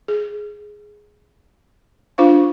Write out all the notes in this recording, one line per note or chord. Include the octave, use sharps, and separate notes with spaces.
G#4
D4 F4 C5 F5 C#6